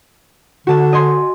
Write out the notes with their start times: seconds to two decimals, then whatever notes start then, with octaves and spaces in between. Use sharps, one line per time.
0.67 D3 F#4 A5 E7
0.93 D#5 G#5 C6